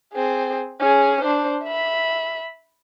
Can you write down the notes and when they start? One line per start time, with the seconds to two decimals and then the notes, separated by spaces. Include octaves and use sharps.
0.13 C4 G#4
0.80 C#4 G#4
1.23 D4 C5
1.64 E5 B5